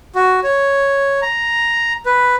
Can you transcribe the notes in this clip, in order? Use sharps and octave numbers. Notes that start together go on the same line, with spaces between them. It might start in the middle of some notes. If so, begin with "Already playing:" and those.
F#4
C#5
A#5
B4